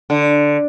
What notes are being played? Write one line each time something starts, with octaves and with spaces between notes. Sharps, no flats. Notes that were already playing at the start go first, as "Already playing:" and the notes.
D3